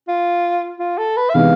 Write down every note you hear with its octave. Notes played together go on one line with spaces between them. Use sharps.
F4
F4
A4
B4
E5
C3 E3 G#3 B3 D#4 F5